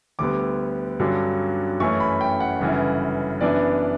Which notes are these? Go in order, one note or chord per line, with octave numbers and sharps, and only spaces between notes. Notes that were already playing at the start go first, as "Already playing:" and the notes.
D2 D3 G3 B3 D6
G2 D3 F#3 C#4
F#2 E3 A3 C#4 C#6
B5
G5
F#5
G1 F#2 C#3 E3
F#2 E3 B3 D4 D5